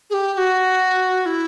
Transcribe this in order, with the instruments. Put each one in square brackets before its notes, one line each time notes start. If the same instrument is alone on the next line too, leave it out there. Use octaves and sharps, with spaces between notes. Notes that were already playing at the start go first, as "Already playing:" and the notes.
[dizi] G#4
G4
G4
F#4
E4